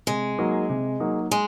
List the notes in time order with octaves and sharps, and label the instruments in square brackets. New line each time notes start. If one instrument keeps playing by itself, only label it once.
[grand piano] C3 [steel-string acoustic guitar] G#3
[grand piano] F#3 A#3 D#4 F#4
C3
F#3 A#3 D#4 F#4
[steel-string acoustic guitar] G#3